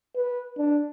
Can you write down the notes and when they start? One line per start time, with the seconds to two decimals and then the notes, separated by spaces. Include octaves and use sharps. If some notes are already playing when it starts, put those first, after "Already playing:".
0.15 B4
0.58 D4